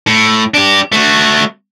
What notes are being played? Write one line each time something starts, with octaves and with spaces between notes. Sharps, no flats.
A2
D4 G4
A3 F#4